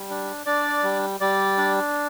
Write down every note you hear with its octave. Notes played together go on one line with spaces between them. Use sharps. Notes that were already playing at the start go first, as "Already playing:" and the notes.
Already playing: G3
D4
D4 D5
G3
G3 D5
D4